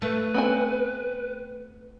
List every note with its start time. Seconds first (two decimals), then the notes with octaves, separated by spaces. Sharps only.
0.02 A3 B4
0.34 B3 C4 G#5